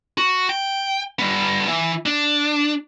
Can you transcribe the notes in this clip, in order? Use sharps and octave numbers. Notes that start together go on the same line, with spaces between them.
F#4
G5
G3 B3
E3
D4